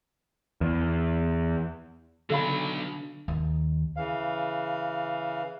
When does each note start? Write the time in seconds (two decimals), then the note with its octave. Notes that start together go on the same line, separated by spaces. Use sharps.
0.61 E2
2.30 B2 D3 F#3 A4 F5 B5
3.28 D#2
3.97 C#3 E3 F5